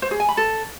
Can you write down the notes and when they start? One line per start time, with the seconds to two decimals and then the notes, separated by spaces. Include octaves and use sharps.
0.02 C5
0.11 G#4
0.20 G#5
0.29 B5
0.37 A4